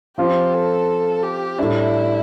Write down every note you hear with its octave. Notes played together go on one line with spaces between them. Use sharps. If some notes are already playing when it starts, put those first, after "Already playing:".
F3 C4 F4 G4
A4
G4
A2 G3 D4 E4